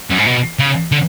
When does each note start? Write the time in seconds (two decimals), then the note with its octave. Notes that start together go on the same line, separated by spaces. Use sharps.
0.10 F#2
0.18 G#2
0.26 B2
0.59 C#3
0.92 D3